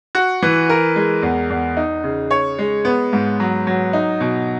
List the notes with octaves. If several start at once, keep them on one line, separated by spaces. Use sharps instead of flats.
F#4
E3
A#4
G#3
E2
E2
D#4
C#3
C#5
G#3
B3
G#2
F#3
F#3
D#4
B2